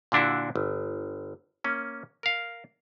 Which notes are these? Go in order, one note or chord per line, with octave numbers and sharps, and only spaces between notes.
A#2 D3 D4 E4 F#4
G1
A#3 C#4
A#4 F5